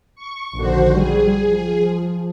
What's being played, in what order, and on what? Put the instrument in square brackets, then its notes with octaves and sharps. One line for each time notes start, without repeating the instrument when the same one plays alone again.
[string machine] C#6
[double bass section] A#1 D3 D#3 [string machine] F#4 C5
[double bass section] G3 [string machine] G#4
[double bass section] F3